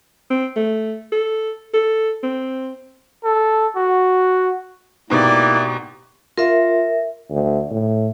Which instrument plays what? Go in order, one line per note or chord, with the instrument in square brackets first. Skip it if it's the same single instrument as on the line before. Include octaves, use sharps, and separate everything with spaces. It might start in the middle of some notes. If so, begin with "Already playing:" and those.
[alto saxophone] C4
A3
A4
A4
C4
[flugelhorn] A4
F#4
[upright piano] G#2 B2 [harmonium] A#3 E4 [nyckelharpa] G4 D5
[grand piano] F4 [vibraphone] A#4 E5
[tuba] D2
A2